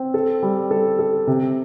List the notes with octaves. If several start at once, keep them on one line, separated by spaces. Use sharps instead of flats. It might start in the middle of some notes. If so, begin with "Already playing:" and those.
Already playing: C4
A4
G3
A4
A4
C3